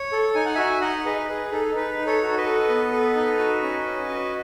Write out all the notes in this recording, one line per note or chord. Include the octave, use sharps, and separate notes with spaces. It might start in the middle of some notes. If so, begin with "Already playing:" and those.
Already playing: C#5
A4
D#4 G#5
F#5
F#4 E5 G#5
D#4 D#5 F#5
G#4 B4 D#5
G#4 B4
D#4 A4
D#4 B4
D#4
A4 C#5
F#4
B4 D#5
A4
B3
A4
D#4
F#4
C#4
C#4
F#4